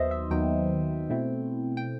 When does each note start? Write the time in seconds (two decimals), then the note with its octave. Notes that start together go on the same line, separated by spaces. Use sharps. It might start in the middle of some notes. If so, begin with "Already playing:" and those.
Already playing: D#2 D#3 F#3 B3 D#4 C5 D#5 E5
0.11 E5
0.30 D#2 D#3 F#3 B3 D#4 G5
1.10 B2 A3 C4 E4
1.77 G5